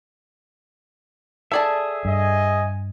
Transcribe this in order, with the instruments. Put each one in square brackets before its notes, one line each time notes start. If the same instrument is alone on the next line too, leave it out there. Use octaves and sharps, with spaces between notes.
[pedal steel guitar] G#4 E5 [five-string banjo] A4 D5 A5
[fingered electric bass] G2 [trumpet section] D#5 G#5